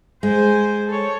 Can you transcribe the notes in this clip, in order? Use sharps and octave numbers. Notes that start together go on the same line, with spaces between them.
G#3 C5 G#5
A4 C#5